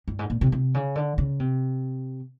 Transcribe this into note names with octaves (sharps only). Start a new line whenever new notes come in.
G2
G#2
A#2
C3
C3
C#3
D3
C#3
C3